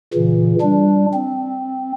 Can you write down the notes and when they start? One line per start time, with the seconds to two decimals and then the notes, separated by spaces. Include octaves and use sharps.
0.14 A#2 C#3 E3
0.61 G3 D4
1.14 C4